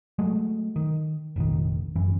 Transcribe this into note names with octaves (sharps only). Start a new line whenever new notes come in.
F#3 G#3 A3
D#3
F1 A#1 D#3
G#1 F#2 E3